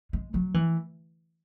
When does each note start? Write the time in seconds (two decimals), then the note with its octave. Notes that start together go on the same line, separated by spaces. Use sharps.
0.13 G#3
0.34 F#3
0.54 E3